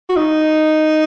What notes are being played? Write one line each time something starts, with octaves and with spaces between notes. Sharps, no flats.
F#4
D#4